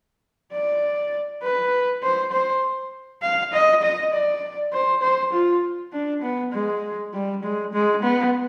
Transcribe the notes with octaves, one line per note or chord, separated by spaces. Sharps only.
D5
B4
C5
C5
F5
D#5
D#5
D5
C5
C5
F4
D4
B3
G#3
G3
G#3
G#3
B3